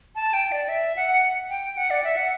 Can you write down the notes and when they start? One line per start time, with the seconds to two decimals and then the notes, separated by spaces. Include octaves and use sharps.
0.15 A5
0.33 G5
0.52 D5
0.69 E5
0.96 F#5
1.50 G5
1.77 F#5
1.90 D5
2.04 E5
2.17 F#5